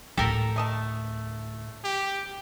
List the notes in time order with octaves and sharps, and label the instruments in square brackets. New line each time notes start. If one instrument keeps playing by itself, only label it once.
[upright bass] D2 A2 [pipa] G4 [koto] A4 A#4
[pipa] A3 D#5 A5
[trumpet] G4